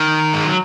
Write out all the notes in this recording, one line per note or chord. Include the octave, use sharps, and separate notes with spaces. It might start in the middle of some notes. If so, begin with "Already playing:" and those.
Already playing: D#3
G#3
F#3